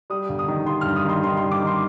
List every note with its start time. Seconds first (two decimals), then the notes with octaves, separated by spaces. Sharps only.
0.10 G3 D#6
0.29 G1
0.39 D#6
0.48 D#3
0.66 G3 C6
0.81 G2 F6
0.96 D#6
1.05 D#3 C6
1.24 D#3 C6
1.37 C6
1.43 G3
1.51 D6
1.62 D#3 C6